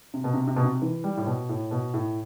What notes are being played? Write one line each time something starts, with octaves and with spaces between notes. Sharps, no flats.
C3
B2
C3
C3
B2
C3
E3
G3
A2
B2
A2
B2
A2